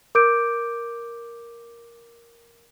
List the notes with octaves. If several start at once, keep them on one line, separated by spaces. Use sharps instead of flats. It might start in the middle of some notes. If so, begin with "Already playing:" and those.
A#4 D6 G6 D7